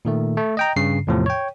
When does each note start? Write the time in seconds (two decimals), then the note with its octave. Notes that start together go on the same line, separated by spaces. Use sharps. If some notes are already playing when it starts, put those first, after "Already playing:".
0.05 A#2 D#3 A3
0.37 A3
0.57 D#5 G5 A#5
0.76 G2 C#3 C7
1.07 E2 A2 C3 F3
1.26 C#5 G5